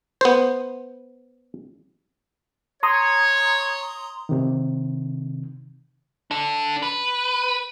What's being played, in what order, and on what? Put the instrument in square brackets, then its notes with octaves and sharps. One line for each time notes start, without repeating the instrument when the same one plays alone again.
[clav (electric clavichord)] B3 C5
[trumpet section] C#5 [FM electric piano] A#5 C6 D#6
[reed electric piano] C3 D#3
[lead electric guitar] D4 A4
B4